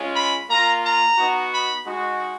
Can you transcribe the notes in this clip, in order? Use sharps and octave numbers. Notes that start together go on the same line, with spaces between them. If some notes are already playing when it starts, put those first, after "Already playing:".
Already playing: G#3 C#4 F4
B5
A#3 F4 A#5
A#5
B3 D#4 F#4
B5
G#3 D#4 F#4